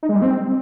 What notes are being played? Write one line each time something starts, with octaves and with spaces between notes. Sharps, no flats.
D#4
G#3
G3
C4